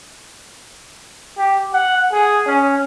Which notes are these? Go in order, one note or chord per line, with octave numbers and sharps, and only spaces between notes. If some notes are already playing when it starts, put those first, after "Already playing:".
G4
F#5
G#4
C#4